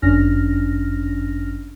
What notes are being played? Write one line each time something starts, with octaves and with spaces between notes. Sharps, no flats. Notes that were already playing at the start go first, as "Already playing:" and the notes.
G1 F#2 C#4 D4 F6 A#6